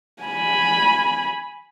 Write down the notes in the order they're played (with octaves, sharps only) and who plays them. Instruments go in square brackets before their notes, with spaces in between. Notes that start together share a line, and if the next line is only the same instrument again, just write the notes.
[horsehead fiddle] G#5 B5